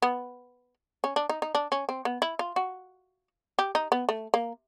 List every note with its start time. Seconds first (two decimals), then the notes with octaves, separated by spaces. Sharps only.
0.02 B3
1.04 C#4
1.16 D4
1.29 D#4
1.42 D#4
1.55 D4
1.72 C#4
1.89 C4
2.05 B3
2.22 E4
2.39 F4
2.56 F#4
3.59 G4
3.75 D#4
3.92 B3
4.09 A3
4.34 A#3